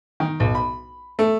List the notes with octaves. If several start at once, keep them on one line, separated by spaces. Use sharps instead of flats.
D#3
B1
B5
A3